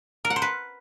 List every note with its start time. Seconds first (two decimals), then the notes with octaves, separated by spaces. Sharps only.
0.25 A#4
0.30 F#5
0.36 C5
0.42 B4